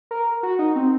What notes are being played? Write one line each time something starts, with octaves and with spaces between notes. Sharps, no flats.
A#4
F#4
D#4
C4